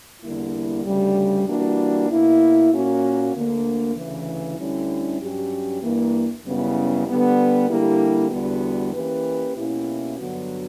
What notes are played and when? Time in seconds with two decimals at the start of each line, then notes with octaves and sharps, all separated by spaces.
0.21 E2 D3 G3 A#3 E4
0.84 D2 C#3 G3
1.46 E3 G3 A#3 D4 F#4
2.09 B2 A#3 E4
2.71 A#2 A#3 C#4 F#4
3.33 D2 D3 A#3
3.96 D2 C#3 E3
4.57 D2 D3 G3 C#4 E4
5.19 G2 F#3 C#4 G4
5.81 G2 E3 A#3
6.43 F#2 C#3 G3 B3 E4
7.07 D3 G3 B3
7.68 D3 G3 A#3 E4 G4
8.30 E2 D3 G3 B3 F#4
8.92 E3 A#3 C#4 G4 B4
9.55 B2 A#3 C#4 E4 G4
10.17 G2 D3 F#3 B3 F#4